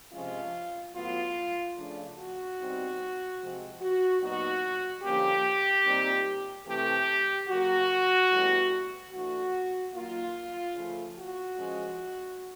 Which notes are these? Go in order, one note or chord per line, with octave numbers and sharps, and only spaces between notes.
C3 F3 G#3 C#4 F4
A2 F#3 B3 F4
C#3 F3 A3 D4
F#4
B2 G3 C4 D#4
C3 F3 G#3 C4
F#4
A#2 F#3 B3 D#4 F#4
D3 F3 A#3 C#4 G4
A#2 G3 C4 D#4
C3 E3 A3 C4 G4
C#3 F#3 A#3 F#4
A2 E3 G3 B3
E3 A3 D4 F#4
D#3 F#3 A#3 F4
C#3 F3 A3
F#4
F3 G#3 C#4